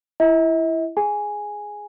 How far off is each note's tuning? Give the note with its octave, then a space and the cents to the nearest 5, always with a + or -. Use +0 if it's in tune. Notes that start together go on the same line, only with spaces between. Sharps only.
E4 +15 E5 -45
G#4 +5 G#5 +0